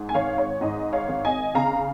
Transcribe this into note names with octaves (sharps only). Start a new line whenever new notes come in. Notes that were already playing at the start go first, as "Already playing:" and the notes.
Already playing: G#2
G#5
G#1 C#5 F5
C#5
G#2 D#5
C#5 F5
G#1
D#5 G#5
C#3 F5 A#5